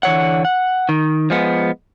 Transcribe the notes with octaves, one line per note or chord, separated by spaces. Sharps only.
D3 E3 C#5 F#5
F#5
D#3
F3 G#3 B3